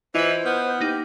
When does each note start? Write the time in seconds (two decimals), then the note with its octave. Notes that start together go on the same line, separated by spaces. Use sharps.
0.15 E3 E4 F4 B4 C5 D#5
0.46 B3 F6 G6
0.81 A#3 D#4 G4